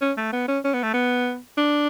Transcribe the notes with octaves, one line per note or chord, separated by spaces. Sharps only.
C#4
A3
B3
C#4
C#4
B3
A3
B3
D4